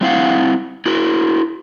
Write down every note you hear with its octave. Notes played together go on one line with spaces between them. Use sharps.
G3 C4 E4 F5 F#5
E4 F#4 A#4